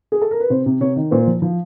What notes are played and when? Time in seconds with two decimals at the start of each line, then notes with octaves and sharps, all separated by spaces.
0.12 G#4
0.22 A4
0.31 A#4
0.40 B4
0.50 C3 C5
0.66 C3
0.81 C3 C#5
0.96 D#3
1.11 A#2 C5
1.27 F3
1.42 F3